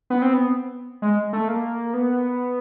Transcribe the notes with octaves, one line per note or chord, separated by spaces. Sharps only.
B3
C4
B3
G#3
A3
A#3
B3